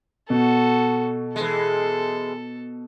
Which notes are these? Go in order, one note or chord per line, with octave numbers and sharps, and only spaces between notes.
B2 F#4 A4
E3 G#3 A4